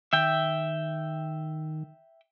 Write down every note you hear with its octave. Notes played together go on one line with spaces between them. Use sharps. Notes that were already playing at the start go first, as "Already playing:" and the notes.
D#3 E5 G5